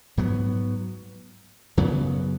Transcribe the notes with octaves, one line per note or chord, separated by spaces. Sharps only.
G#2 F#3 B3
F#2 C#3 F#3 B3